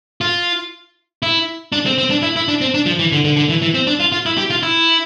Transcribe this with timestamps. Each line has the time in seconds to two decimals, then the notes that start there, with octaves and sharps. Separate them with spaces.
0.21 F4
1.23 E4
1.72 D4
1.86 C4
1.98 C4
2.10 D4
2.22 E4
2.36 E4
2.48 D4
2.61 C4
2.74 D4
2.86 F3
2.99 E3
3.12 D3
3.24 D3
3.36 D3
3.49 E3
3.62 E3
3.74 C4
3.87 D4
4.00 F4
4.12 F4
4.26 E4
4.37 G4
4.50 F4
4.63 E4